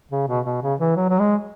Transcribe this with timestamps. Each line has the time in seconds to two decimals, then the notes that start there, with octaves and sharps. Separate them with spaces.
0.11 C#3
0.28 B2
0.45 B2
0.62 C#3
0.80 E3
0.96 F#3
1.09 F#3
1.19 G#3